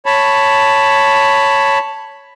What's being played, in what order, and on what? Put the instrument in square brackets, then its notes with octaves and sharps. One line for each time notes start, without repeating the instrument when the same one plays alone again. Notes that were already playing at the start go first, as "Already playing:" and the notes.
[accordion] C#5 A5 B5